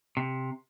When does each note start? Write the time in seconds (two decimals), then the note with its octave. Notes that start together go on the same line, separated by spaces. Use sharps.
0.17 C3